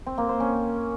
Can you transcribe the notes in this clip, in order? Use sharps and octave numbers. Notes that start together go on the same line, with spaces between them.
C4
A#3
C5
C#4